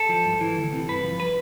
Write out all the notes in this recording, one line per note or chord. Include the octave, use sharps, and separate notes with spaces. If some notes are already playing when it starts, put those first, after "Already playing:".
Already playing: A4
F3
G2
E3
D2
C3 E3
G2 B4
F3
B4